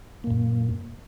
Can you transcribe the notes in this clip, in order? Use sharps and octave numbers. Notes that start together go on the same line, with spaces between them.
F#2 A#2 A#3